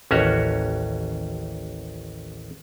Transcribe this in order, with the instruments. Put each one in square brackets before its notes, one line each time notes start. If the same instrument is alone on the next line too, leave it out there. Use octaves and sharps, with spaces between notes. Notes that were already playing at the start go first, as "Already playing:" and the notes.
[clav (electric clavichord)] A1 D#2 C#4 F#4 C#5